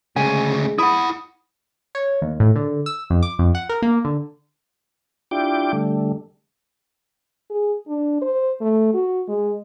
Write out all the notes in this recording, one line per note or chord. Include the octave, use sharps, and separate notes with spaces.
D2 C#3 G#3 G#5
E4 F#5 B5 D#6
C#5
D#2
A2
D3
E6
F2
D6
F2
F#5
A#4
A#3
D3
D4 E4 F4 G4 G5 D6
D3 G3 A3
G#4
D4
C5
A3
F#4
G#3